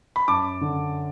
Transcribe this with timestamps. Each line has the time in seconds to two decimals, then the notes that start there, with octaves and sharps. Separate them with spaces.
0.16 B5
0.28 F#2 A5 D6
0.61 D3